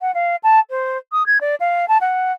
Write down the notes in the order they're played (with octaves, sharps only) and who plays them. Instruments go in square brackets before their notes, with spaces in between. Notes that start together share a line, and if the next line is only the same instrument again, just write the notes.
[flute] F#5
F5
A5
C5
D#6
G#6
D5
F5
A5
F#5